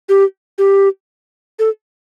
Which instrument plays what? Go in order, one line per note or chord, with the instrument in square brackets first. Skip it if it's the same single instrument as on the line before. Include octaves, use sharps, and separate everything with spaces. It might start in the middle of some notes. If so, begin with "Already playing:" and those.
[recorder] G4
G4
A4